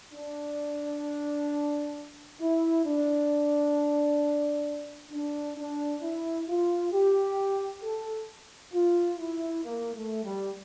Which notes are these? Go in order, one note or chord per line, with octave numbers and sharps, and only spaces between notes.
D4
E4
D4
D4
D4
E4
F4
G4
A4
F4
E4
A#3
A3
G3